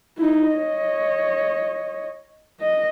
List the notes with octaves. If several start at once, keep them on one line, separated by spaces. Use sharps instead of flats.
D#4 E4
C#5 D#5
D#5